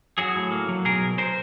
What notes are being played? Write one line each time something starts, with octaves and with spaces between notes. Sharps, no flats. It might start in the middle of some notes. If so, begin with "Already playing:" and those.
F#3 F#4 G#4
A2
A#3
F#3
B1 G#4 A#4
B1
A#4 C5